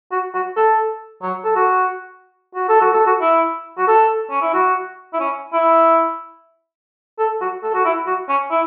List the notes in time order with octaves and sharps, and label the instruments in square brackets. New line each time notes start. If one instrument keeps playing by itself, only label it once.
[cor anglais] F#4
F#4
A4
F#3
A4
F#4
F#4
A4
F#4
A4
F#4
E4
F#4
A4
C#4
E4
F#4
E4
C#4
E4
A4
F#4
A4
F#4
E4
F#4
C#4
E4